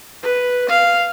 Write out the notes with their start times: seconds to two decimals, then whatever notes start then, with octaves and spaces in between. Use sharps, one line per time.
0.23 B4
0.69 F5